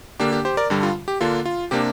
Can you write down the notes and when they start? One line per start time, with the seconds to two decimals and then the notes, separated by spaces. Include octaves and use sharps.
0.20 D3 A#3 D4 G4
0.32 G4
0.45 G4 C5
0.57 A#4 D5
0.70 G2 D3 G3
0.83 F4
1.08 G4
1.21 D3 A#3 D4 F4
1.45 F4
1.71 C3 A#3 D4 G4